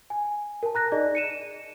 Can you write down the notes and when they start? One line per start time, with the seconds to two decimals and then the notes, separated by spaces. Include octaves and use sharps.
0.10 G#5
0.63 A#4 A5
0.75 A#5 F#6 A#6
0.92 D#4 G#4 D5 D#5
1.15 C#7 D#7 E7